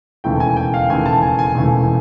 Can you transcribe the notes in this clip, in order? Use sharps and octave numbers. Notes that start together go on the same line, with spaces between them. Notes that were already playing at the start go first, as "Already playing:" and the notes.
E1 D#2 C#3 E3 A3 G5
G#5
G5
F5
E1 D#2 C#3 E3 A3 G#5
A5
G#5
G#5
E1 D#2 C#3 E3 A3